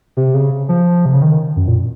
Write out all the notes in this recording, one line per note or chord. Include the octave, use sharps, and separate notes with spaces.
C3
C#3
F3
C3
C#3
D#3
F#2
A#2